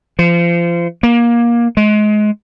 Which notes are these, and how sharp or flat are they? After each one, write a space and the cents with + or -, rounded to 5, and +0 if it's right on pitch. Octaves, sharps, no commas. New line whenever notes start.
F3 -30
A#3 +20
G#3 +25